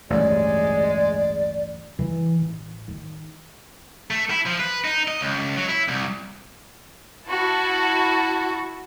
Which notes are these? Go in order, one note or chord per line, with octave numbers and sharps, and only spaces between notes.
A1 D2 G2 G#3 D5
E3
A1
D#3
A3
E4
F3
B4
D#4
D#5
C#2
F#3
E4
C2
E4 F#4 A5